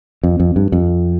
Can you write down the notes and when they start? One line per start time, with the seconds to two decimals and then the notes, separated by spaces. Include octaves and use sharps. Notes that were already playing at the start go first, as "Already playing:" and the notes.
0.23 F2
0.40 F2
0.56 G2
0.72 F2